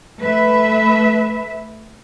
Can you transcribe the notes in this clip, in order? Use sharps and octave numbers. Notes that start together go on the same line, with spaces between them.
A3 B4 E5